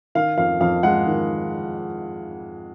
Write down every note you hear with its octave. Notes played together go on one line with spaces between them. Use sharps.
D#3 F5
F2 F5
F2 F5
G#3 F#5
D#3